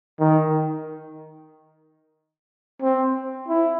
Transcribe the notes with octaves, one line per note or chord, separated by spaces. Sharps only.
D#3
C4
E4